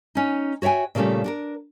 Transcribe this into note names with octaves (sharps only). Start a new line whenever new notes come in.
C#4 D#4
F#4 C#5 E5 G5 G#5
A#2 C#3 G3 A3 C#4 F4
D4 F#4 A#4